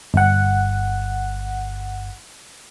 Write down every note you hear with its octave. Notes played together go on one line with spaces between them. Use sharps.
G1 F#5